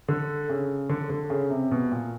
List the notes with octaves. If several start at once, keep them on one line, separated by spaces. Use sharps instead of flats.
D3
C#3
D3
D3
C#3
C3
B2
A#2